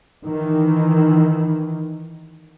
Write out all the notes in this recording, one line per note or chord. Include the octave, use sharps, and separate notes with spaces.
D#3 E3